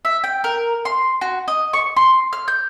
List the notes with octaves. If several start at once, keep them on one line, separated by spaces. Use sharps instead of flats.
E5
G5
A#4
C6
F#4
D#5
C#6
C6
F6
G6